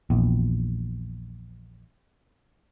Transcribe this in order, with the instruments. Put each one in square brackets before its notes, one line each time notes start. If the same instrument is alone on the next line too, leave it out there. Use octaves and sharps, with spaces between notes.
[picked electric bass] A#1 E2